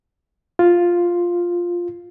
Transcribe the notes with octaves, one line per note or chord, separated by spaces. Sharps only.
F4